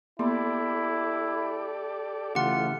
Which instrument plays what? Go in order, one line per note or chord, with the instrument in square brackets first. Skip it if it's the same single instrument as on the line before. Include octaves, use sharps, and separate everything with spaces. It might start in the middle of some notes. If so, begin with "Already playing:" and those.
[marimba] A#3 B3 C6 [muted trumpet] E4 [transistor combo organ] G4 A4 D5
[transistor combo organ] C#3 E3 A3 [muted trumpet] F4 [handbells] G4 F#5